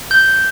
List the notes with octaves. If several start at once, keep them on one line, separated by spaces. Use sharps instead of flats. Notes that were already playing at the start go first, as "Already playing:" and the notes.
G6